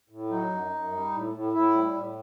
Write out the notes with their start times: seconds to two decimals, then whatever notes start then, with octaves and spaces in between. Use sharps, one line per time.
0.09 A2
0.30 F#3 D#4
0.50 F#2
0.71 F#2
0.91 G3
1.12 A2
1.33 A2
1.53 A2 E4
1.74 G3
1.94 A2